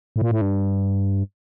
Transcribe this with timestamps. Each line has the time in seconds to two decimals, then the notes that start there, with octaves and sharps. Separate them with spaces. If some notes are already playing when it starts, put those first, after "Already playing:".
0.16 A2
0.22 A#2
0.31 A2
0.41 G2